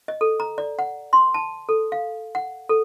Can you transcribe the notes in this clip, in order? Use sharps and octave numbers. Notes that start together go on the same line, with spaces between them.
D#5
A4
A#5
D5
F#5
C6
A5
A4
F5
F#5
A4